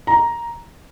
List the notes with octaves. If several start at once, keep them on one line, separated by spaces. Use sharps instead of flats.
A#5